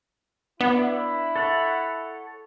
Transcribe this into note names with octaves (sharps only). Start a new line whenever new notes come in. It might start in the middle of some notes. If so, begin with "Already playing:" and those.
B3 D4 E4
A4 C#5 F#5